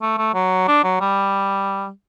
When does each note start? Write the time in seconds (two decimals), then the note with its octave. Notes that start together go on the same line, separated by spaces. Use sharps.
0.02 A3
0.18 A3
0.34 F#3
0.68 D4
0.84 F#3
1.00 G3